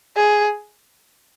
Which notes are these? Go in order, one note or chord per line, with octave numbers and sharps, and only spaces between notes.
G#4